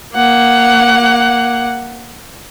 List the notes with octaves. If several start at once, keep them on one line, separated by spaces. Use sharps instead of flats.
A#3 F#5